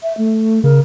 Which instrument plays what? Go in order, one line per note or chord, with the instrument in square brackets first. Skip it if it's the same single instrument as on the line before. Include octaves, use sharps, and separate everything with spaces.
[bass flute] E5
A3
[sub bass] C#3 [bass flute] A#4